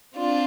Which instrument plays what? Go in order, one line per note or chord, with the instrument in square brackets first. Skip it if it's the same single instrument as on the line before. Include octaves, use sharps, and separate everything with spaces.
[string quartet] C4 D4 F4